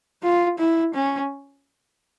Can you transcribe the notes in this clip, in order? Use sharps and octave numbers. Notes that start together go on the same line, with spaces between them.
F4
E4
C#4